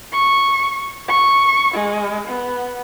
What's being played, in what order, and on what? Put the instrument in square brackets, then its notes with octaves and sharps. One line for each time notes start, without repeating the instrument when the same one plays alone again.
[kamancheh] C#6
C#6
G#3
B3